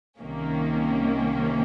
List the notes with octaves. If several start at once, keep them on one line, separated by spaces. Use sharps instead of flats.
C2 C3 D#3 A#3 C#4